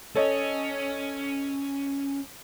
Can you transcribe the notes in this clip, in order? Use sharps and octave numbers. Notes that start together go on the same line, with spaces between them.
C#4 A4 C#5 D#5